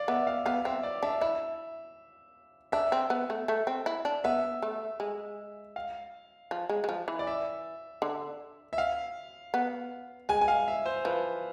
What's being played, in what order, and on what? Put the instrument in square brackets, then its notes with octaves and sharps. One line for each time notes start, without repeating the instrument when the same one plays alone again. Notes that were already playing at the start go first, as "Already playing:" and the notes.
Already playing: [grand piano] D5 F5
[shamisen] B3 [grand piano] E5
[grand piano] F5
[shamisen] B3 [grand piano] F5
[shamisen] C4 [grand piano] E5
[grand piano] D5
[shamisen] D4 [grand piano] E5
[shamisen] E4 [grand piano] E5
[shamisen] D4 [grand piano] E5
[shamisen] C4
B3
A3
A3
C4
E4
D4
[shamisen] B3 [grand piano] E5
[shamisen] A3
G#3
[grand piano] F5
[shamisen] F3
G#3
G#3
F3
E3
[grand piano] D5
E5
[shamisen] D3
[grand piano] E5
F5
[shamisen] B3
[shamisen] G#3 [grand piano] G#5
[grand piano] G#5
F5
E5
C5
[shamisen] F3 [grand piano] B4